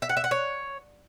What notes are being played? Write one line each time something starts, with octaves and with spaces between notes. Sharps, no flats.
E5
F#5
E5
F#5
C#5